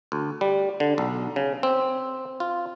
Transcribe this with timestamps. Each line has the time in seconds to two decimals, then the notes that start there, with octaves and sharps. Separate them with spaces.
0.12 D2
0.41 G3
0.80 D3
0.98 B1
1.36 C#3
1.63 C4
2.40 F4